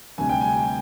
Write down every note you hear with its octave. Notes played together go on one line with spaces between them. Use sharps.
D2 C3 G3 G#5
G5
G#5